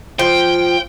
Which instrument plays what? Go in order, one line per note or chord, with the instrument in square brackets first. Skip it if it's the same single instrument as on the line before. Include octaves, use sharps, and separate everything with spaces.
[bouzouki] F3 [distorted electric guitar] G5